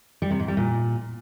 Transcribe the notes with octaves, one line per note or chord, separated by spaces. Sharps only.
G3
C3
G#2
G3
A#2